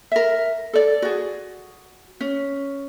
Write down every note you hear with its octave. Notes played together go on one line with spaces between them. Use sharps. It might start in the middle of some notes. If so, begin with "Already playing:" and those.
A#4 E5
A4 D5
F#4 G#4
C#4